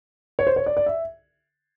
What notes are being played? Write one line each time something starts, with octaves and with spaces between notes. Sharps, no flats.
C#5
C5
C#5
D5
D5
E5